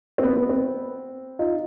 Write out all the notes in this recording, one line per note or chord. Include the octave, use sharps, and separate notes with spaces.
C4
B3
B3
C4
D#4 F4